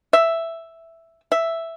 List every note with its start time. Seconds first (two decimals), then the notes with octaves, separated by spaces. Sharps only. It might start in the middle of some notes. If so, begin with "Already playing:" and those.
0.13 E5
1.32 E5